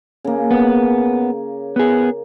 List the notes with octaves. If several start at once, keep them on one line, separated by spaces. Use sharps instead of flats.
C#3 A#3
B3
B3 G#4